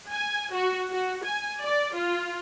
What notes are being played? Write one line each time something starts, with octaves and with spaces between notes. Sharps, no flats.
G#5
F#4
F#4
G#5
D5
F4